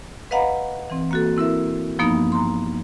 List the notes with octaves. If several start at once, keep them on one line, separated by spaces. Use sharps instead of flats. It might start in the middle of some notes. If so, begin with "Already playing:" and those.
B4 D#5 F5 F#5 A#5 B5
E3 C4
A#3 F#4 A4
C4 E4 A#4 E5
G2 F3 A#3 B3 D#4
A#5 C6